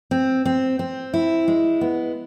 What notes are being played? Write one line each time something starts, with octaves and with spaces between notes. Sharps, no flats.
C4
C4
C4
E4
G#3
B3